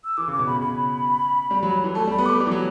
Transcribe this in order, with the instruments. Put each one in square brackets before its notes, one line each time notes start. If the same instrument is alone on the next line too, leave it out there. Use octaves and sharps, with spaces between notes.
[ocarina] E6
[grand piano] E3 [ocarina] D6
[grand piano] C#3 [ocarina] D6
[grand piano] B2
[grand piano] C#3 [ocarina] B5
[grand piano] C#3 [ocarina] B5
[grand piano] G3
F#3
E3
[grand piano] A3 [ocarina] A5
[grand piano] G3 [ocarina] B5
[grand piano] B3
[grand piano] A3 [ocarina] D6
[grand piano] G3
E3
F#3